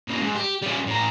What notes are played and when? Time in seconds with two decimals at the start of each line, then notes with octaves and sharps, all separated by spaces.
0.08 C#3 A#3
0.21 G#2
0.36 G4
0.63 G3 C#4
0.87 A2 A#5